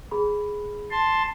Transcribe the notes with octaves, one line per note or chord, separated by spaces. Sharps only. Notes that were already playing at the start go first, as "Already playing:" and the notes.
G#4 B5
A5 C6